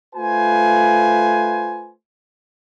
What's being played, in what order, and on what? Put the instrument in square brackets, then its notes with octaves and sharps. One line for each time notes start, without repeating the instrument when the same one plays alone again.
[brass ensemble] A3 F4 B4 C5 G#5